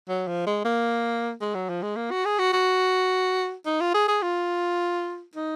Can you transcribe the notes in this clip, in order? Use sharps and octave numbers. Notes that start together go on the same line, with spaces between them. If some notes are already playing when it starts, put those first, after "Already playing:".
F#3
F3
G#3
A#3
G#3
F#3
F3
G#3
A#3
F#4
G#4
F#4
F#4
D#4
F4
G#4
G#4
F4
D#4